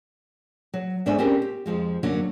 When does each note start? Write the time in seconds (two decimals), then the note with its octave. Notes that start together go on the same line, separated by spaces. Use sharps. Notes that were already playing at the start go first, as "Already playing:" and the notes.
0.74 F#3
1.06 G#2 D4 A4 D5 E5 G#5
1.19 C4 C#4 G4 A#4
1.42 G4
1.66 F2 F3 G#3
2.03 F#2 D3 F#3 A#3